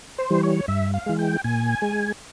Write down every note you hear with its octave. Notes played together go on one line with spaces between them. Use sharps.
C5
E3 G3
C#5
G2 E5
F5
E3 G#3
G5
A#2 G#5
G#3